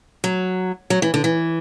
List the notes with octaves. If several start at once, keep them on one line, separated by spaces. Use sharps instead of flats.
F#3
F#3
E3
D3
E3